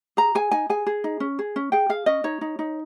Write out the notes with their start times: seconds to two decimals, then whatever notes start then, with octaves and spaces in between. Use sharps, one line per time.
0.17 G#4 A#5
0.35 G#4 G#5
0.51 D#4 G#5
0.70 G#4 G#5
0.86 G#4
1.04 D#4
1.20 C#4
1.39 G#4
1.56 C#4
1.72 G#4 G5
1.89 G#4 F5
2.06 C#4 D#5
2.24 D#4 C#5
2.41 D#4
2.59 D#4